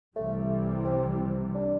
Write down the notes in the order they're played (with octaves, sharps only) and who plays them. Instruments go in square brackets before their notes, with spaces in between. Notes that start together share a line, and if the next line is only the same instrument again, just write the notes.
[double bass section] C2 C3 E3 G3 [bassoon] A3
[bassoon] C4
D4